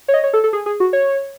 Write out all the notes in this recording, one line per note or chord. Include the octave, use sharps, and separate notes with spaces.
C#5
D#5
C#5
A4
A4
G#4
G#4
F#4
C#5